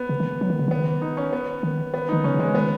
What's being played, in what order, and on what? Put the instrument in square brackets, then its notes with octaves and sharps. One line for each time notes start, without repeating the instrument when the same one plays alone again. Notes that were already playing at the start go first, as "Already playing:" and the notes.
Already playing: [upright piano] B3
[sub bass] C#3
D#3
F#3
D#3
C#3
[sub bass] D#3 [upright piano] B3
[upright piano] D#4
C#4
B3
[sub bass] D#3
[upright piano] B3
[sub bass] D#3 [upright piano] D#4
[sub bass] C#3 [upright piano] C#4
[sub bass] C#3
[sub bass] D#3 [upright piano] G#3
[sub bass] D#3 [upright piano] B3